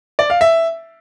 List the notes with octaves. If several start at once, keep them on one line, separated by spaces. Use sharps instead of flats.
D5
F5
E5